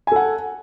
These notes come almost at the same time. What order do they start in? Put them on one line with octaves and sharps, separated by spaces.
G#5 A4 F#5